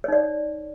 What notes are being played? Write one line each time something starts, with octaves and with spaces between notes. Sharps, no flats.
D#4 C#5 D5